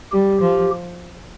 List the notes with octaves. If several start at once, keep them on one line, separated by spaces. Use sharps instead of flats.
G3 G4
F3